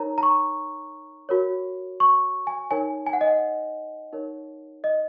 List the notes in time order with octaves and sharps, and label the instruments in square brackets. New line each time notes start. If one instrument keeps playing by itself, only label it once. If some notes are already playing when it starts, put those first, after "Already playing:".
Already playing: [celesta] D#4 A#4 C#5 A#5
A#5
C#6
F#4 A#4 C#5
C#6
G#5
D#4 A#4 C#5 G#5
G#5
F#5
D#5
F#5
D#4 A#4 C#5
D#5